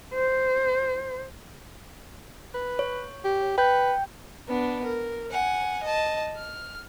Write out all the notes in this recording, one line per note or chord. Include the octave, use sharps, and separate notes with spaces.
C5
B4
C#5
G4
B4 G5 G6
B3 D4
A#4
F#5 G#5
D#5 A5
F6